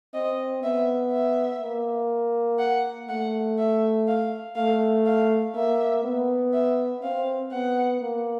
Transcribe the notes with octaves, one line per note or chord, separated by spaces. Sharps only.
C4 D#5
B3 E5
E5
A#3
F#5
A3 F#5
E5
F5
A3 F5
F5
A#3 E5
B3
E5
C4 F5
B3 F#5
A#3